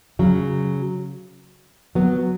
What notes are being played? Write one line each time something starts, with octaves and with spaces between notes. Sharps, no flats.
C#3 F#3
F#3 B3